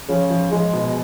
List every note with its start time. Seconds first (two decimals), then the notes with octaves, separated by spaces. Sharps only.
0.09 C#3 F3
0.30 F3
0.52 F3 G#3
0.73 B2